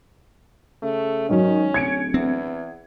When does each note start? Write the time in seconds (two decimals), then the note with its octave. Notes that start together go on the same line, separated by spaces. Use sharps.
0.82 C#3 A3
1.29 G#2 D#3 F#3 C#4
1.74 D1 G#6 C#7 D7
2.14 E2 C4